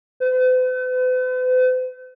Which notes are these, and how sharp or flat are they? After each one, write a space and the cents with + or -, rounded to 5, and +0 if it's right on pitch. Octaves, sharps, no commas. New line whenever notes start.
B4 +45